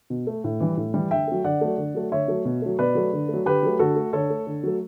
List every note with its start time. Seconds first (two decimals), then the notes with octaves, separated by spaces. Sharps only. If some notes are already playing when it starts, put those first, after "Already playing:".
0.10 B2
0.27 A3
0.44 A2
0.60 E3 G3
0.77 A2
0.94 E3 G3
1.11 D3 E5 G5
1.27 F#3 A3
1.44 D3 D5 F#5
1.61 F#3 A3
1.78 D3
1.95 F#3 A3
2.11 D3 C#5 E5
2.28 F#3 A3
2.45 B2
2.62 F#3 A3
2.79 B2 B4 D5
2.95 F#3 A3
3.13 D3
3.29 F#3 A3
3.46 D3 G4 B4
3.63 F#3 A3
3.79 D3 F#4 A4
3.96 A3
4.13 D3 A4 C#5
4.30 A3
4.47 D3
4.63 F#3 A3